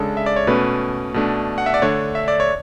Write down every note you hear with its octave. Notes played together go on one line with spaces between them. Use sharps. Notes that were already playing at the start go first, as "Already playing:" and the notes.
Already playing: C#3 G#3 D4 A4
E5
D5
C#5
B2 A3 C#4 B4
B2 A3 D4
F#5
E5
D5
D3 A3 D4 C#5
E5
D5
C#5